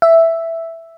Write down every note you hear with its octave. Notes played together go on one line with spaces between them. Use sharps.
E5